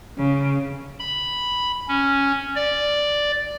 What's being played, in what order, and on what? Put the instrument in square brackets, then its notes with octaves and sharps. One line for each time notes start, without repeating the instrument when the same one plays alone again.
[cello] C#3
[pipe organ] B5
C#4
D5